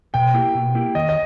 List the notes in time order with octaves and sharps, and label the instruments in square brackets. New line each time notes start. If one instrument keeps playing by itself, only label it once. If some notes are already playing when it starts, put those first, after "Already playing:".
[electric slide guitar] B2 [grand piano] G5
[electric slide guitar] A#3 E4 G4
B2
A#3 E4 G4
[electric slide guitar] D#3 [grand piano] D#5
[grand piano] D#5